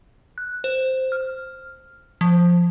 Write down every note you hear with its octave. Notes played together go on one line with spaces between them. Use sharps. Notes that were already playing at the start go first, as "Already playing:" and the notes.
F#6
C5
F6
F3